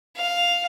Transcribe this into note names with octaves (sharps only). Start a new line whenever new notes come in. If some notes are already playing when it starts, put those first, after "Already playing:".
F5